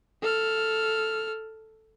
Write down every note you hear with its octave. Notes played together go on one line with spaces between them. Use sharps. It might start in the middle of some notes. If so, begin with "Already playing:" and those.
A4 F6